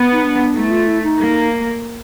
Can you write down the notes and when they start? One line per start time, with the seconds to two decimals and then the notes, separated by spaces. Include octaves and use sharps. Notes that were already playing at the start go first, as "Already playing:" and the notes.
Already playing: B3
0.12 D#4
0.23 D4
0.56 A3 D#4
0.65 E4
0.71 F4
0.87 E4
1.03 D#4
1.20 A#3